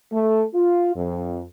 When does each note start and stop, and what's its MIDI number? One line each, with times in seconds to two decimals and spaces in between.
0.12 0.44 57
0.54 0.95 65
0.96 1.42 41